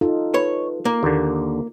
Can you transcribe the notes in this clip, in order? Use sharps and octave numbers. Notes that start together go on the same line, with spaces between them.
D#4 F4 A4
B4 C#5
A#3
D#2 D3